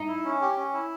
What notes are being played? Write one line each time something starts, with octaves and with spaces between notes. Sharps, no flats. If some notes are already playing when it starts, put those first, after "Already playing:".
Already playing: D#4
E4
C#4
G4
C#4
E4